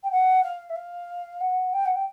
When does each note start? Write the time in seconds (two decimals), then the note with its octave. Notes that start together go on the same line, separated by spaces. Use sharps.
0.03 G5
0.11 F#5
0.43 F5
0.69 E5
0.75 F5
1.40 F#5
1.73 G5
1.85 F#5
1.95 G5